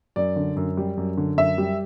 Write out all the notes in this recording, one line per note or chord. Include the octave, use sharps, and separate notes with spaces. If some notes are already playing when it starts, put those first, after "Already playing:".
F#2 D5
D3
F#2
G3
F#2
D3
F#2 E5
G3